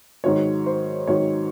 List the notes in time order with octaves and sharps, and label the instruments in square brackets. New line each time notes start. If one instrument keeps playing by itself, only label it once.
[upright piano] G#2 D#3 F#3 C#5
C5
G#2 D#3 F#3 C#5